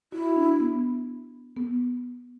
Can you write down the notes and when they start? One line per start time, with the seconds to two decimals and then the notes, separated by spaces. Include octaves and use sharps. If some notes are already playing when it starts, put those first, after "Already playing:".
0.12 E4 F#4
0.36 D4
0.60 B3
1.57 B3